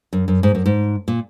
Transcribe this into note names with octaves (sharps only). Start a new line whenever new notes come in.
F#2
F#2
G#2
F#2
G#2
A#2